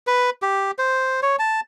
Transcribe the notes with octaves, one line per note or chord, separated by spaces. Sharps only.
B4
G4
C5
C#5
A5